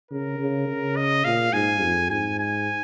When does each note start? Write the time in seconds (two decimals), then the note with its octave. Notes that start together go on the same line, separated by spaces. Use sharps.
0.11 C#3 A#4
0.39 C#3
0.68 C#3
0.96 D#5
1.25 A#2 F5
1.53 G#2 G#5
1.82 F2
2.10 G#2 G#5
2.39 G#5